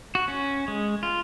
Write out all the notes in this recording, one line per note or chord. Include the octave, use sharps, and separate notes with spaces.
F#4
C#4
G#3
F4